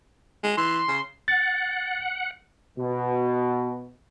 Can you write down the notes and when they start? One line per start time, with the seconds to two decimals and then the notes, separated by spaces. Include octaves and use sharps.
0.43 G#3
0.57 E3 C6
0.88 C#3
1.28 F#5 A6
2.79 B2